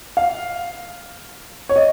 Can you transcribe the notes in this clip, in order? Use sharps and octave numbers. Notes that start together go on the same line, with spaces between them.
F5
C#5
D#5